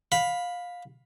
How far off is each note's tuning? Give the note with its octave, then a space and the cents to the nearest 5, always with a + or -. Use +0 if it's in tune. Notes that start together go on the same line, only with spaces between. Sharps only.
F5 +20 B5 +0